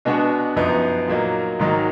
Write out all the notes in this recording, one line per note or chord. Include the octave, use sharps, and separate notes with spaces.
B2 G#3 B3 D4 F#4
F#2 F3 B3 D#4
A#2 F#3 A#3 D#4
G#2 D#3 F#3 A#3 D#4